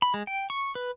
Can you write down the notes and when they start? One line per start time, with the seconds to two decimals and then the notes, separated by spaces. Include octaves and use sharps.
0.02 B5
0.14 G#3
0.27 G5
0.50 C#6
0.75 B4